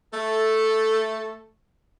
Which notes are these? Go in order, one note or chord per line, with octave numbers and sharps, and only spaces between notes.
A3 A4